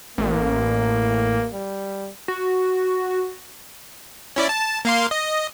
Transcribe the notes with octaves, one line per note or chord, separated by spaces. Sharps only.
A1 A#3
G3
F#4
C#4 E4 D5
A5
A#3 F5 C6
D#5